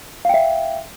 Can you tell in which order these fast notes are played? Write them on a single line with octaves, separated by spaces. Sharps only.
F5 G5 E5